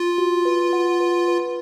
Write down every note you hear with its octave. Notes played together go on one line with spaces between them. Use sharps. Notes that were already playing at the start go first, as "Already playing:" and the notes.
Already playing: F4
F#4
B4
F#5
B4
B4